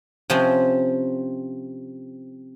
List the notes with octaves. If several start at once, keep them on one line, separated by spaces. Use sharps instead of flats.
C3 F3 C4 C#4 C5